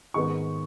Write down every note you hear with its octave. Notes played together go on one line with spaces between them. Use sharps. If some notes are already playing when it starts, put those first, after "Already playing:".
G#2 D#3 G#3 B3 D#4 C#6